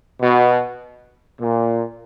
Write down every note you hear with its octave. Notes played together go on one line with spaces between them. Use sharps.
B2
A#2